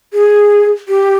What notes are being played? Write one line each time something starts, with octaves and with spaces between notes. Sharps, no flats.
G#4
G4